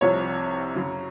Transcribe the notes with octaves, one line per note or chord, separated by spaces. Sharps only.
C2 C3 F3 C#5
F#2 C#3 F#3